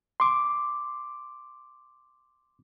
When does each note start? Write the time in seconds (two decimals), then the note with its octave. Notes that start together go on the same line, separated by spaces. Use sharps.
0.20 C6 D6